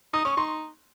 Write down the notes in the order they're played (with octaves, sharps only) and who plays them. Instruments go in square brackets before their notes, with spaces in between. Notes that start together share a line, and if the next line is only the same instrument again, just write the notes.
[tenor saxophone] D#4 [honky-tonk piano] D#6
[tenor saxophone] C#4 [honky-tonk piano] C#6
[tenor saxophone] D#4 [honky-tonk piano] C6